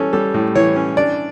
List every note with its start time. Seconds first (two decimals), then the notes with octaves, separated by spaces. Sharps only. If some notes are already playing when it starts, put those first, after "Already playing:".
Already playing: E3 G3 C#4 A4
0.13 G3 A4
0.34 A2
0.55 E3 C#5
0.76 C#4
0.97 D4 D5